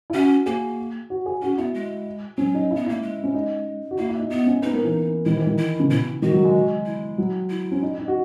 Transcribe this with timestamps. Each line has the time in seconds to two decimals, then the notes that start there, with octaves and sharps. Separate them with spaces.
0.10 E4
0.14 C#4 F#4
0.46 A#3 G#4
1.10 F#4
1.26 G#4
1.42 C#4 F#4
1.58 B3 E4
1.74 G#3
2.38 F#3 C#4
2.54 D#4
2.71 E4
2.76 B3
2.86 A#3 E4
3.02 G#3
3.24 C#4
3.34 D#4
3.91 F#4
3.98 A#3 E4
4.09 E4
4.19 D#4
4.30 B3 D#4
4.46 C#4
4.62 B3 D#4
4.73 A#3
4.84 E3
5.26 D#3 E4
5.36 E3
5.47 D#3
5.59 E4
5.80 C#3
5.90 B2 E4
6.22 D#3 F#4
6.33 F#3
6.44 G#3
6.86 E4
7.18 F#3
7.50 E4
7.72 C#4
7.82 D#4
7.98 D#4
8.08 F#4